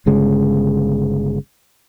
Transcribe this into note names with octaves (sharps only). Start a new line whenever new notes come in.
G1 C#3 G#3